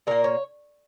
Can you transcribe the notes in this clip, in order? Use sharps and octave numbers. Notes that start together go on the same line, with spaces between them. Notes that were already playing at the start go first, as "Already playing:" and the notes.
A#2 A#3 A#4
C#5